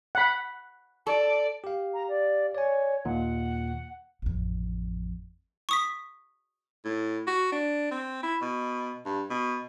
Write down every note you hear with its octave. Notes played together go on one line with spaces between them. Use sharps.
F#5 B5
A4 D5
G4 F5
A#5
D5
C#5 D5 G#5
D#2 A#2 D#3 F#5
A1 F2
C#6 D#6 B6
A2
F#4
D4
C4
E4
B2
G2
B2